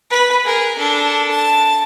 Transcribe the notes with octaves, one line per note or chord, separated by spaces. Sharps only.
B4
G#4 A#4
D4 A4
A5